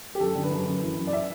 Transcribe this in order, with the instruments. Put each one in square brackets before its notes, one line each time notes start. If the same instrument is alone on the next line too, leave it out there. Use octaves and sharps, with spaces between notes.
[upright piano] G4
F#2 A4
D3
B4
F#2
F#2
E3
F#2
D5
E5